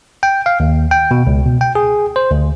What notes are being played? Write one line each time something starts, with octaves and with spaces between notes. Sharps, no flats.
G5
F5
D#2
G5
B2
C#2
B2
G5
G#4
C5
D2